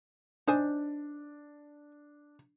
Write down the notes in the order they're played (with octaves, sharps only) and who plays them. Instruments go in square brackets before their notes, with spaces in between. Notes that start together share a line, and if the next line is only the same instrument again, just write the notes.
[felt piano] D4 [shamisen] D#4 C5 G#5